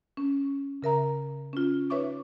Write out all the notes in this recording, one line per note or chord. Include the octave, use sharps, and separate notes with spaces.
C#4
C#3 A#4 E5 A#5
C#4 F4
D#4 B4 C#5 E5 C#6 D6